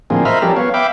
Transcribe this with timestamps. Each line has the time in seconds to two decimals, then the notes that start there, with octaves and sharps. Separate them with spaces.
0.10 A2 D3 F3 A#3 C4 G#4
0.25 A#4 C5 D#5 E5 B5 F6
0.42 F3 G3 C#4 G4 A4 A#4
0.56 B3 C#5 F5
0.74 E5 F5 G5 B5 D6